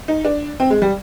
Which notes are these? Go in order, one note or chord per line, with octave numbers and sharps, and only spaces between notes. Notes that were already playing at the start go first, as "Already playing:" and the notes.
D#4
D4
C4
G#3
G3